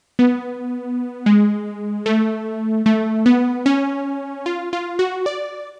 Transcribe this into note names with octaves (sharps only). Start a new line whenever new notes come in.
B3
G#3
A3
A3
B3
C#4
F4
F4
F#4
D5